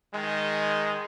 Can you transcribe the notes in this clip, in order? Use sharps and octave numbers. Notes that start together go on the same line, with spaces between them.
D#3 G#3